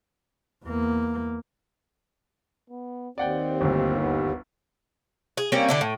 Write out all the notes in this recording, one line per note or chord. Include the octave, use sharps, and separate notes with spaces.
E2 A#3
B3
D#2 C4 D5 F#5 G5
G1 D2
B3
G#4
G3 A#3 C4 C#4
D3 D4 E4
A2